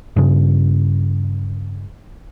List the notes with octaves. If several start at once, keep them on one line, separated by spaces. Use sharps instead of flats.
G2 C#3